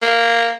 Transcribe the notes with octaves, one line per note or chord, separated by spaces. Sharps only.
A#3